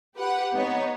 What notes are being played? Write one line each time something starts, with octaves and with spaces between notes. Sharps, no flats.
G4 B4 F#5
B3 D#4 C#5